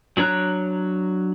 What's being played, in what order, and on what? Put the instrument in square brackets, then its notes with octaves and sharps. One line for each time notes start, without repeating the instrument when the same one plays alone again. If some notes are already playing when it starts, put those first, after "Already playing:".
[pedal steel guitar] F#3 D4 C#5 A#5 F#6